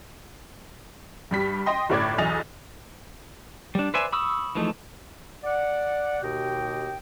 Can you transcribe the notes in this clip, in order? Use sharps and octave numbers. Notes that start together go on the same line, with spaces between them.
G2 G3 B6
D#5 G5 C6
G1 A2 D5 D6 G#6
B1 E2 D#5 G#5 A6 F7
G3 D4
B4 C5 D5 E5 G#5
B5 C#6 D#6 E6
E3 F3 G#3 A3 D#4
D5 F#5
D#2 B2 G4 D#5 G5